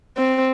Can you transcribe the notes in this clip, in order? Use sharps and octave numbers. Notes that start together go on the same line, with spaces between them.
C4